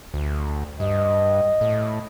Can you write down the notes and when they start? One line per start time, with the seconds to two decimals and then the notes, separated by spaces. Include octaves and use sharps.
0.14 D2
0.80 G2 D#5
1.61 A2